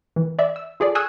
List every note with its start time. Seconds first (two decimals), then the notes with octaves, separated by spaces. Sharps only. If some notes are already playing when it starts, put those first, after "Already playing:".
0.16 E3
0.39 D5 E5
0.56 E6
0.80 F4 G#4 A4 D5
0.95 G#5 C#6 D#6 E6 F#6 G#6